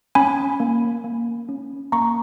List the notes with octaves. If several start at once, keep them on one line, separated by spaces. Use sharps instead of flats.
C#4 G#5 B5
A#3
A#3
C#4
A#3 A#5 C#6